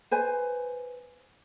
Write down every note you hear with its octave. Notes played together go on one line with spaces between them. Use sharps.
B4 C5 G#5